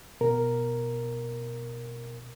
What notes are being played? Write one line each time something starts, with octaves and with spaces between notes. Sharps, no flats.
B2 A#4